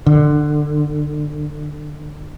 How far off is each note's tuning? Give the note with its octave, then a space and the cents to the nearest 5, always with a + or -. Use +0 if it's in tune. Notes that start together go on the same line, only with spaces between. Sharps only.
D3 +20